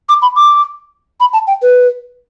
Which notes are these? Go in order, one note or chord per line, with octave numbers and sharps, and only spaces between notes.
D6
B5
D6
B5
A5
G5
B4